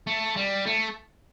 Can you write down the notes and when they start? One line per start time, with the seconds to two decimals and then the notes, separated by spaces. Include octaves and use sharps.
0.07 A3
0.36 G3
0.66 A3